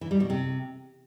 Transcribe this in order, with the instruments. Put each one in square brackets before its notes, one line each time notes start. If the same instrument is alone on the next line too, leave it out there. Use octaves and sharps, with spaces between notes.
[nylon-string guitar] E3
G3
B2
C3